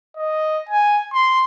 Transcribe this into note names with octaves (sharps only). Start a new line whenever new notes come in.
D#5
G#5
C6